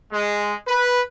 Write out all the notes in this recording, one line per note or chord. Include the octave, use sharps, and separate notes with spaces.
G#3
B4